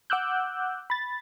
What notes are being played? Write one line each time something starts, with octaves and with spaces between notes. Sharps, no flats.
F#5 D6 E6 F#6 G6
B5 A6